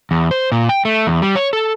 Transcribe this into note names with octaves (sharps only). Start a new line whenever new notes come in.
E2
C5
A#2
G5
A3
E2
G3
C#5
A4